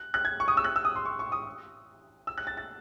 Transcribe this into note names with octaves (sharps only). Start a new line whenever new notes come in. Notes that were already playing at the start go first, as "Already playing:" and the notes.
Already playing: F#6
F#6
G#6
C#6
D#6
E6
F#6
E6
D#6
C6
C#6
C#6
D#6
E6
F#6
A6
A6